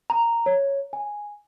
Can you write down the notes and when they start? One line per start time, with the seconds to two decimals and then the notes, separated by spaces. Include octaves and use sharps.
0.10 A#5
0.46 C#5
0.93 G#5